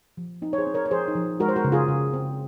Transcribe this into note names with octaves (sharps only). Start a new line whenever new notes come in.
F3
C4 D#4
C#5
G#4 C5
C4
A#4 C#5
C#5
F3 G#4 C5
D#4
F3
G#3 F#4 A#4
C5
F#4 A#4
C#3
F4 G#4
C#3
C4